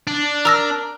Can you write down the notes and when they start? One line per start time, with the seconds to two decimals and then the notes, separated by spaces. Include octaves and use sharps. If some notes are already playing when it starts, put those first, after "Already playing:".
0.07 D4
0.45 A#4 A#5 E6 A#6